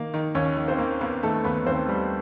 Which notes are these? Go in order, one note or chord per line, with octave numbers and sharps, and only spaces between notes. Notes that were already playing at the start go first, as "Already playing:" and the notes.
Already playing: D#3 A#3
D#3
D#2 C#4 C#5
D#3
C4 C5
A#3
A#3 B3 B4
D#3 A3 A4
D#2 B3 B4
D#2 C4 C5
G3